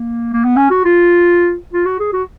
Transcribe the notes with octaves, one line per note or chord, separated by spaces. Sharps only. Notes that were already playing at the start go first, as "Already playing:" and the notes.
Already playing: A#3
A#3
B3
C#4
F#4
F4
F4
F#4
G#4
F#4